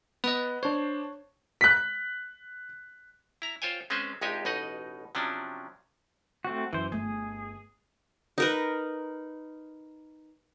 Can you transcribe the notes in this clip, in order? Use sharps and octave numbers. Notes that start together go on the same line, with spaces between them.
B3 B4 D#5
D4 C5 C#5
F#6 B6
E4 A#5
F4 C5 C#5 G5 G#5
G#3 C4 C#4 B4 C5
A#1 F2 G#3 D#4 G4 G#5
A1 B2 D#4 D#5 F#5
C3 F3 F#3 C#4 D4
A3 C4 F#4
F#2 E3 C5
G1 A3 G#4
D#4 A#4 B4